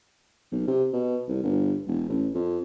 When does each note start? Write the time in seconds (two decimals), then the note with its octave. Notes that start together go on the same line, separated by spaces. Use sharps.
0.52 B1
0.68 C3
0.93 B2
1.28 C2
1.43 G1
1.87 E1
2.09 A1
2.34 F2